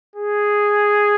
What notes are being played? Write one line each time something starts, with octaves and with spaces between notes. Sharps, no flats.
G#4